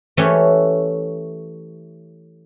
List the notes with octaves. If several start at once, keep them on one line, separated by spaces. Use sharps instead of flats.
E3 A3 C#4 G4 A4